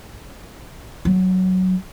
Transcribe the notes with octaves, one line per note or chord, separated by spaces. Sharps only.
F#3